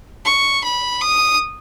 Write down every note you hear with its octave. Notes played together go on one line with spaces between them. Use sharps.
C#6
B5
D#6